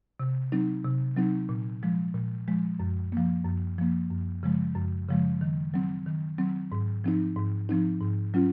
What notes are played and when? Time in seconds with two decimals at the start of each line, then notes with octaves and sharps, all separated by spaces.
0.20 C3
0.52 F#3 C4 D#4
0.84 C3
1.17 F#3 C4 D#4
1.49 A#2
1.83 F3 G#3
2.14 A#2
2.47 F3 G#3
2.80 F#2
3.12 F3 A#3
3.45 F#2
3.78 F3 A#3
4.11 F#2
4.43 C#3 F3 G#3
4.75 F#2
5.09 C#3 F3 G#3
5.41 D#3
5.74 F#3 C4
6.06 D#3
6.38 F#3 C4
6.72 G#2
7.04 F3 C4 D#4
7.36 G#2
7.69 F3 C4 D#4
8.01 G#2
8.34 F#3 C#4 F4